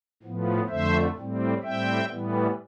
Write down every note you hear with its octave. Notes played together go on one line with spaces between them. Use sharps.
A2 F3 B3
F2 D3 A3 C5 E5
A2 G3 C4
A2 G3 C4 E5 G5
A2 E3 G3 B3